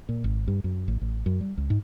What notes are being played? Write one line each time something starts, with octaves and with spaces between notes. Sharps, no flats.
A#2
G#1
G2
F#2
A1
A1
F#2
G3
C#2
G#2